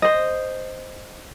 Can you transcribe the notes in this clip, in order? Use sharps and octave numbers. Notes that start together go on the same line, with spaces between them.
C5 D#5